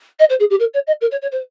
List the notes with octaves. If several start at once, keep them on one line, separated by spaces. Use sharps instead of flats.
D#5
C5
G#4
G4
A#4
C#5
D#5
A#4
C#5
C#5
C5